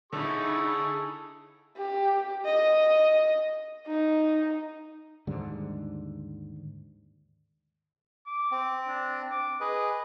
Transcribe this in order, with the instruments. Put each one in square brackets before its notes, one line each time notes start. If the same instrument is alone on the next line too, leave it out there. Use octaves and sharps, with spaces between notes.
[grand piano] D3 [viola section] D#4 E4 [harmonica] G#4 C#6 D#6 [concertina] A4
[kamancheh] G4
D#5
D#4
[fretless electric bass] D#2 G#2 D3 G3
[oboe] D6
[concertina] C4
[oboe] D4
D6
[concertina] G#4 B4 [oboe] D#5